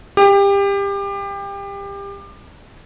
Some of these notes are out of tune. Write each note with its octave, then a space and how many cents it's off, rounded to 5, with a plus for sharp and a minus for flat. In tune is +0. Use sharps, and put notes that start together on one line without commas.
G4 +25